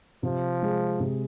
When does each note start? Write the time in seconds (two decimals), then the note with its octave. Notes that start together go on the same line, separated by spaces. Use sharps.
0.23 C3 F3
0.63 G#3
1.00 C3